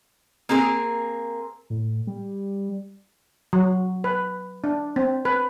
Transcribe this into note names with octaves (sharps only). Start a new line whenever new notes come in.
A#3 C4 G#4 A#4
A2
G3
F#3
B4
D4
C4
B4